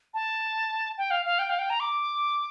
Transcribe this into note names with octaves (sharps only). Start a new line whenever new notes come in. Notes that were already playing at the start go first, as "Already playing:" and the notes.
A5
G5
F5
F5
G5
F5
G5
A#5
D6